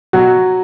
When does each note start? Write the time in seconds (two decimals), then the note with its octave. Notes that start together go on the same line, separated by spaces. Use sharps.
0.13 B2 F#3 F#4